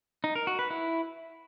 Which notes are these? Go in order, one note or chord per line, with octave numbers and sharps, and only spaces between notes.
D#4
A#4
F#4
B4
E4